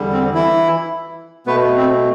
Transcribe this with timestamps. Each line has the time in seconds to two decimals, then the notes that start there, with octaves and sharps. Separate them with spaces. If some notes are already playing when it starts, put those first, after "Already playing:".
Already playing: E2 D3 G3
0.12 C4
0.34 E3 E4
1.46 B2 A3 B3 B4
1.77 C4